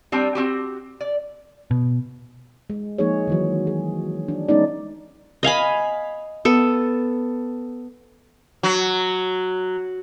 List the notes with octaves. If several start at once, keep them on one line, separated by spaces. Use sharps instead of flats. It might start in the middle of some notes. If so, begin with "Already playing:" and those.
G3 C4 D4
C4 F#4 G4
D5
B2
G#3
F3 G#3 A#3 D#4 G#4 C#5
D#3 E3 F#3
G#4
D4
G#3 B3 C#4 D#4 D5
D#5 F5 G#5 B5
B3 A4
F#3